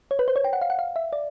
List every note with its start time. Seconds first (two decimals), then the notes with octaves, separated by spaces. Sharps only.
0.11 C#5
0.19 B4
0.28 C5
0.36 C#5
0.44 G5
0.53 F#5
0.61 F5
0.70 F#5
0.79 F5
0.96 E5
1.13 D5